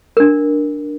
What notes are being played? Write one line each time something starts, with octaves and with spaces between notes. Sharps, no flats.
D4 A#4